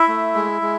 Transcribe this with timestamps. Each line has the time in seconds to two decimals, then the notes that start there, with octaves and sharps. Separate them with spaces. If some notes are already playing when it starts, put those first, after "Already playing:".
Already playing: E4 E5
0.08 A3
0.35 G#3
0.62 G#3